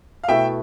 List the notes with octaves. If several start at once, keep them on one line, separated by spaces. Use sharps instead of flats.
F5
B2 A3 E4 A4 E5 G5